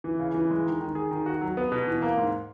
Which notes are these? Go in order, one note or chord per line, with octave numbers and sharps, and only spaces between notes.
E3
C#3
E3
G#3
D#3
D#3
G#4
D#3
F#4
F#3
B3
B2
E3
A#3
G#2